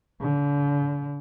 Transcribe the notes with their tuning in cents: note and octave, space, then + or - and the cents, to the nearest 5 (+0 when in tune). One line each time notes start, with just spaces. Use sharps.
D3 -40